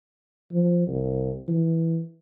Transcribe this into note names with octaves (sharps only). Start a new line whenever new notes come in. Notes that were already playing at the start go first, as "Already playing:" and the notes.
F3
C2
E3